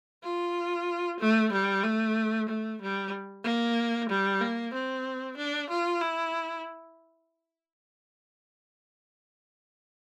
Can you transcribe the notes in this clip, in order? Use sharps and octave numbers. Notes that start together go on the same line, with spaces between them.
F4
A3
G3
A3
A3
G3
A#3
G3
A#3
C4
D4
F4
E4